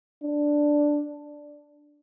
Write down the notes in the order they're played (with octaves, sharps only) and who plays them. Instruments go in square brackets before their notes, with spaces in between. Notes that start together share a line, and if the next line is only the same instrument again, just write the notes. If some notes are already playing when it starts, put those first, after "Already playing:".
[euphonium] D4